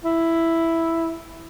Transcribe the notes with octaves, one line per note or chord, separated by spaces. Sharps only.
E4